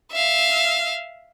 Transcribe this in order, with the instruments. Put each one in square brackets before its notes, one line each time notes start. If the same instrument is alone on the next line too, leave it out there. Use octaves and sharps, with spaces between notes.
[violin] E5 F5